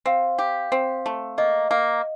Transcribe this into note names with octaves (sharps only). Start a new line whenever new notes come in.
C4 F5
G4
C4
A3
A#3 D#5
A#3